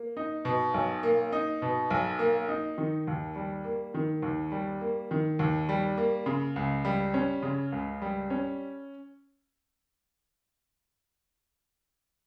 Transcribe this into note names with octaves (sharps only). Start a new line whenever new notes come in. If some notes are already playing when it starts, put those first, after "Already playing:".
Already playing: A#3
D#4
B2
B1
A#3
D#4
B2
B1
A#3
D#4
D#3
D#2
G3
A#3
D#3
D#2
G3
A#3
D#3
D#2
G3
A#3
C#3
C#2
G3
C#4
C#3
C#2
G3
C#4